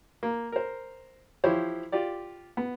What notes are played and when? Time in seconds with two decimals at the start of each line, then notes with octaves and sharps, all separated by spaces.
0.23 A#3
0.52 A#4 C5
1.44 E3 F3 E4 G4 C5 C#5
1.92 F4 G4 D5
2.57 B3